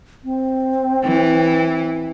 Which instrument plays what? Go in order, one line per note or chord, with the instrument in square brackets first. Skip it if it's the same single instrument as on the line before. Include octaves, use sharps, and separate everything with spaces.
[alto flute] C4
[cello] E3